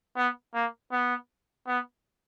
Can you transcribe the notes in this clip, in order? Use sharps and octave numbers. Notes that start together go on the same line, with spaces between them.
B3
A#3
B3
B3